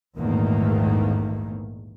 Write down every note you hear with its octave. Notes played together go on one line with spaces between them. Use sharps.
A#1 E2 G#2 D#3 A3 A#3